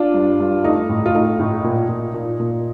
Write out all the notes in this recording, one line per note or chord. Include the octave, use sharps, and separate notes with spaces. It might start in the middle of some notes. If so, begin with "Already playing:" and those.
Already playing: D4 F4
G2
G2
A3 D#4
A2
F4
A3 D#4
A2
A#2
A#2
A#2
A#2